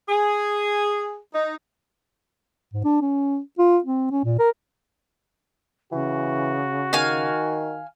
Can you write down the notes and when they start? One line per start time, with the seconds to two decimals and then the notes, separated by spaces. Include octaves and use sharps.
0.08 G#4
1.34 D#4
2.73 G#2
2.84 D4
3.02 C#4
3.59 F4
3.84 C4
4.11 C#4
4.24 A#2
4.39 A#4
5.92 C#3 E3 F#4
6.93 D#3 F5 G#5